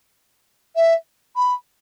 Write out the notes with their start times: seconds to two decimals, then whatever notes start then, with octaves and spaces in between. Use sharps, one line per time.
0.75 E5
1.36 B5